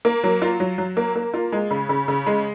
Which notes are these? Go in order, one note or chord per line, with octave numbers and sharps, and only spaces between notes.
A#3
F#3
F4
F#3
F#3
A#3
A#3
F4
G#3
C#3
C#3
C#3
G#3